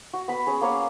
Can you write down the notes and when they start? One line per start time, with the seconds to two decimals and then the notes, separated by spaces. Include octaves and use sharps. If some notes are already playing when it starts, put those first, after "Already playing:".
0.13 F#4
0.28 B3 B5
0.47 C#4 G#4
0.61 A#3 C#4 G#4 C#5